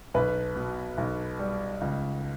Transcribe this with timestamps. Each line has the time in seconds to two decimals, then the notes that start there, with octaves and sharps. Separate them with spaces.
0.14 B1 B4
0.56 B2
0.98 B1
1.39 G3
1.81 C#2